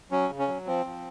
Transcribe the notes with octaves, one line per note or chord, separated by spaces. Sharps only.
F#3 C#4
C#3
C#4
F#3
F3 C4
F3